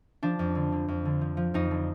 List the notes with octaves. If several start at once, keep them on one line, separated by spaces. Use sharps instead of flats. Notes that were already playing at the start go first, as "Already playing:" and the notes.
F3 D4
F2
D3
D3
F2
D3
F3
F3
F2 D#4
D3